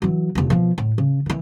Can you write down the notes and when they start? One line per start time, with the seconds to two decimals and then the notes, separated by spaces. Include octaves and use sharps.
0.02 E3 F#3
0.35 F1 E2
0.50 B2 F3
0.78 A2
0.98 C#3
1.26 D#3 E3